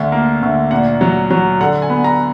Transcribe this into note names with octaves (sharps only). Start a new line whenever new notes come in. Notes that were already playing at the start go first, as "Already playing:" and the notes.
Already playing: D2 D3
A#3
D2
A#2 F#5
F#3
F#3
D3 F#5
G#5
B3
A#5